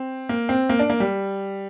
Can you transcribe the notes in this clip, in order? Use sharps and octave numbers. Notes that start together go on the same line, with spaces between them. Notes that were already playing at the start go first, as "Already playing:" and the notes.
Already playing: C4
A#3
C4
A#3
D4
A#3
G3